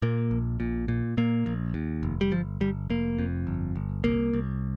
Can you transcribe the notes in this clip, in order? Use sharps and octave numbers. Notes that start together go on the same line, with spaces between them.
A#2 A#3
A#1
A#2
A#2
A#2 A#3
A#1
D#2
F1
G3
G1 F3
G1 G3
F1 A#3
F2
G1
G1
C2 A#3
C2